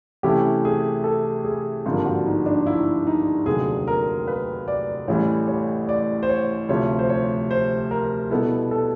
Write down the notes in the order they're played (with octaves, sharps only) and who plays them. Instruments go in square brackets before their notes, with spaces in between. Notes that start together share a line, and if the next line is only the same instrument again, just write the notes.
[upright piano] C3 E3 A3 C#4 E4 [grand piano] G4
[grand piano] G#4
A4
G#4
[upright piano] G#1 G2 D3 F3 A#3
[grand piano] F#4
D#4
D4
E4
D#4
[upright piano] F1 D#2 D3 F#3 [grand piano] G#4
[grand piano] A#4
B4
D5
[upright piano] A1 A2 E3 G3 [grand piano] C#5
[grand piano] C#5
D5
C5
C#5
[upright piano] D2 C3 F3 [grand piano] C#5
[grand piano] C5
C#5
C5
A#4
[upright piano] B2 G3 B3 E4 [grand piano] A4
[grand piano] A4